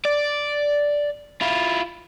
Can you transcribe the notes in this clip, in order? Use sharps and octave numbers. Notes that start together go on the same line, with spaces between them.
D5
E4 F4